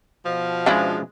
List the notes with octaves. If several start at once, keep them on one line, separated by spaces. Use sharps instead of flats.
B2 F3
C#3 G#3 C#4 D4 E4